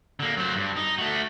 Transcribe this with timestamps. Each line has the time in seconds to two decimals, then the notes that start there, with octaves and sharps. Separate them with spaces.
0.20 D3 A#3
0.37 F#3 C5
0.56 G2
0.76 D#4
0.98 A3 F#4